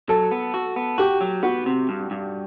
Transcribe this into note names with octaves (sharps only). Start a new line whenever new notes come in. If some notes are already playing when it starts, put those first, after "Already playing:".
F#3 A4
B3
F#4
B3
F#4 G4
F#3
B3 F#4
C3
G2
G2